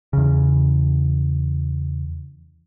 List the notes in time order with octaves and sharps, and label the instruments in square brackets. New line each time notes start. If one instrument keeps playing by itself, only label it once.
[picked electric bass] E2 C#3